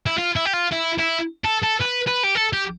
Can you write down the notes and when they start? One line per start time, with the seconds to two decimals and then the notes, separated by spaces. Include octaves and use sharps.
0.06 E4
0.18 F4
0.36 E4
0.46 G4
0.53 F4
0.72 E4
0.99 E4
1.44 A4
1.62 A4
1.81 B4
2.07 B4
2.24 G4
2.35 A4
2.53 G4